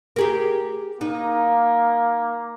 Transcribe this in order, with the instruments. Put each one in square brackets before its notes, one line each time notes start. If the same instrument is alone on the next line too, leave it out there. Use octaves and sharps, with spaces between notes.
[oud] G4 G#4 A#4
[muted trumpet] A#3 [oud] D#4